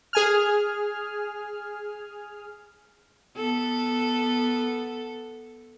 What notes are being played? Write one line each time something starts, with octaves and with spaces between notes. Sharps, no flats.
G#4 G#5 F6
B3 A4